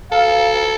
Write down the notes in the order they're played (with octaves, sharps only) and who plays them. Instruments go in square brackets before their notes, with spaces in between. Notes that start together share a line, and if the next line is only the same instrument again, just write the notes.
[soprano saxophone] A4 [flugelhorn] F5